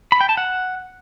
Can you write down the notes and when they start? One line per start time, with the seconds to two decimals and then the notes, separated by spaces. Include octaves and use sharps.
0.12 B5
0.21 G5
0.29 A5
0.37 F#5